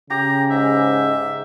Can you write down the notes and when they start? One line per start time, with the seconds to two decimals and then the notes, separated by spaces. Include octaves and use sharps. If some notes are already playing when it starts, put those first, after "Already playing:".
0.10 C#3 G4 A#5
0.51 G#2 E5